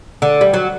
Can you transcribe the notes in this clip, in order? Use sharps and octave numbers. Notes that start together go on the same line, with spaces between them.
D3
G3
F#3